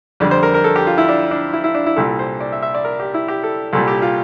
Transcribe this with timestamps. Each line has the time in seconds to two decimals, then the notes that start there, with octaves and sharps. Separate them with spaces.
0.20 F2 D3 G3 D5
0.31 C5
0.43 A#4
0.54 A#4
0.64 A4
0.76 G4
0.87 F4
0.98 E4
1.09 D4
1.31 D4
1.53 E4
1.64 E4
1.75 D4
1.86 E4
1.96 C2 A#2 G3 A4
2.19 C5
2.41 D5
2.52 E5
2.62 E5
2.75 D5
2.85 A#4
3.00 G4
3.14 E4
3.28 G4
3.43 A4
3.73 C2 A#2 G3 A4
3.88 G4
4.02 F4